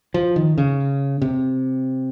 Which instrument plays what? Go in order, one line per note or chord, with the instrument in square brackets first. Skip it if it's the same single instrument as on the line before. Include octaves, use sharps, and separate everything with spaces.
[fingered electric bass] F3
D#3
C#3
C3